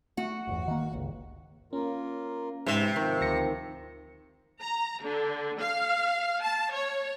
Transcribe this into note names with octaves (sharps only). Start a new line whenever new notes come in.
A3 F#4
G1 E2
D#3 A#3
G1 C#2
A#3 C#4 F4 A#4
G#2 C3 B4 C5
D#3 F3 C4
D2 A#6 C#7
A#5
D3
F5
A5
C#5